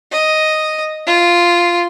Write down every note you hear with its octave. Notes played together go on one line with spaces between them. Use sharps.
D#5
F4